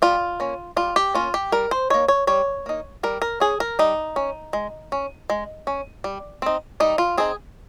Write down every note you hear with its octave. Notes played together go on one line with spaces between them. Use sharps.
G3 F4
A#3 C#4
G3 F4
G4
A#3 C#4 F4
G4
G3 A#4
C5
A#3 D#4 C#5
C#5
G3 C#5
A#3 D#4
G3 A#4
A#4
C#4 G#4
A#4
G3 D#4
C#4
G#3
C#4
G#3
C#4
G3
C4 D#4
G3 D#4
F4
C4 D#4 G#4